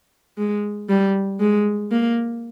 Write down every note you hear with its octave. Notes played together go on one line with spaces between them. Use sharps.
G#3
G3
G#3
A#3